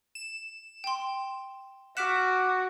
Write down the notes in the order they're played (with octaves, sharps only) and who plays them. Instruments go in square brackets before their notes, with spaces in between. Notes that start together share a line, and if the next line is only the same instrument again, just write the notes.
[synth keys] E7
[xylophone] G5 C6
[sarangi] F#4 [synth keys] F#5 D6 [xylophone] F6 B6 E7